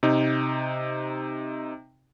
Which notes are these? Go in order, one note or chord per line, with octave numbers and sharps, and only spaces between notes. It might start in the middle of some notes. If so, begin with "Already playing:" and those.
C3 D#4